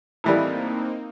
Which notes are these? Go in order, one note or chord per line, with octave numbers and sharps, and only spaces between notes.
A2 E3 G3 A#3 C4 D#4